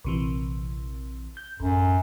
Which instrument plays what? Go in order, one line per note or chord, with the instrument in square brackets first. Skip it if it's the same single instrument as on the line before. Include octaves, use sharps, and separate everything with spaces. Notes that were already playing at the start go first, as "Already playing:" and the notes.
[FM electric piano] A#1 C3 E3
G6
[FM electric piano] A1 [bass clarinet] F#2